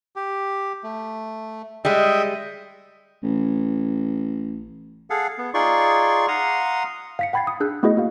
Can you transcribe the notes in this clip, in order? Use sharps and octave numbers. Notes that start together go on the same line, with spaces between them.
G4
A3
G3 G#3 D#5 E5 G5
A1
G#4 A4 F5 F#5
B3
D#4 F4 G#4 D5 C6 C#6
F5 F#5 A#5 C6 D#6
F5 B6 C#7
F#5 G5 B5 G#6 A6 C7
D#6
D4 G#4 E6 F#6 G6
A3 B3 E4 F#4 G#4 D#5
A#3 F#4 F5